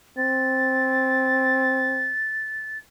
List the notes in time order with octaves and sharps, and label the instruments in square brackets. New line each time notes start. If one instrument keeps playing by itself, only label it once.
[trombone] C4 [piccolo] A6